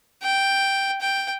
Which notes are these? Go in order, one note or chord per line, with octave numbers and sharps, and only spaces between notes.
G5
G5